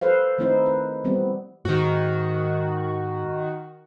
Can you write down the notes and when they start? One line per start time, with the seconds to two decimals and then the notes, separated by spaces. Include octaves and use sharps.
0.01 A4 B4 C5 F5
0.38 D#3 A3 C4 D#4 E4 C5
0.66 B4
1.04 E3 G3 B3 C4
1.65 G#2 D#3 F#4